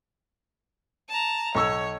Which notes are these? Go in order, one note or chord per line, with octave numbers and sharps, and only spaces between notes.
A5 A#5
B1 C#5 C#6 E6